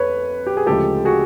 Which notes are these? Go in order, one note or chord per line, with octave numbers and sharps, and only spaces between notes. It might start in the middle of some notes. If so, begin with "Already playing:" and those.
Already playing: F2 B4 C#5
G4
G#4
D2 C#3 F3 G#3 G4 A4
F#4 G#4